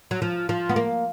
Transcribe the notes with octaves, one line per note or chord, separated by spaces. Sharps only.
F#3
F3
F3
B3
A#3